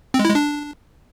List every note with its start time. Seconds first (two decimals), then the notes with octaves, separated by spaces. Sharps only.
0.14 C4
0.19 G#3
0.25 E4
0.30 G#3
0.35 D4